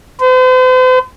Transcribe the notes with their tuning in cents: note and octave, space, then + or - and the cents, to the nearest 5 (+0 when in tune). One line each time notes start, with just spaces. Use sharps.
C5 -45